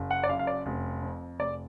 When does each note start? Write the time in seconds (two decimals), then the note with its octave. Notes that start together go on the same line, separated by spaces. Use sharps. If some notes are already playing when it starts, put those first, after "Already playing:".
Already playing: F#1
0.11 F#5
0.23 D5
0.29 F#2 F5
0.39 F5
0.47 D5
0.66 F1
1.02 F2
1.39 F1 D5